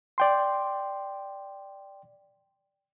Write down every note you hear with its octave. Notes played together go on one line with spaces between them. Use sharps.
D5 G5 C6